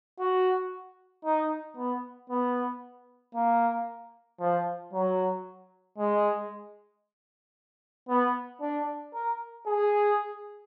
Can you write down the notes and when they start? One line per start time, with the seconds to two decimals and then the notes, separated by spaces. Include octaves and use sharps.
0.19 F#4
1.25 D#4
1.77 B3
2.30 B3
3.35 A#3
4.40 F3
4.93 F#3
5.98 G#3
8.09 B3
8.61 D4
9.14 A#4
9.67 G#4